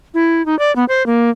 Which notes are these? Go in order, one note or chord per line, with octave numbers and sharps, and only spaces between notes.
E4
D#4
D5
B3
C5
A#3